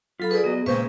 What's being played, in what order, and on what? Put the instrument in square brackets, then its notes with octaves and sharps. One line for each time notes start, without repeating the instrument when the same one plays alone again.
[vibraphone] F#3 A4 B5 [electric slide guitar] F4
[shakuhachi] G#4 [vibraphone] B4 D5
[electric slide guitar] F#3 F#4 D#5 [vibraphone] B3
[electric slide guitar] A#2 C#3 G#3 [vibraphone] B4 E5 C#6 [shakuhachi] C5